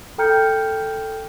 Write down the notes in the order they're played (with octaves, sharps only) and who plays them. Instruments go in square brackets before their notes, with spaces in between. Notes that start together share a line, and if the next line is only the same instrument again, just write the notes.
[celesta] A4 G5 A#5 F6 G6 C#7